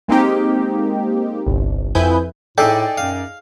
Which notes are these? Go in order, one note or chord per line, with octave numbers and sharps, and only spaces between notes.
G#3 A#3 C4 D#4 G4
G1 C2
F2 E4 B4 G#5 D#6 G6
A2 D#4 G#4 A4 D5 E5 G5
F#2 F5